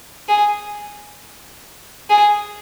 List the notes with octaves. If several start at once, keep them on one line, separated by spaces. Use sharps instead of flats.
G#4
G#4